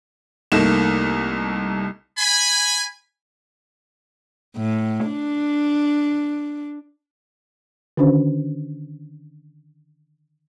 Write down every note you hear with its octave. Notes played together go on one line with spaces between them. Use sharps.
C2 A3 A#3 D#4 E7
G#5 B5
A2
D4
D3 D#3 C#4 D4 F#4 C5